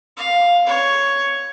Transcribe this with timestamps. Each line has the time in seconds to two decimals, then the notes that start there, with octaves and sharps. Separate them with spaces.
0.17 F5
0.67 C#5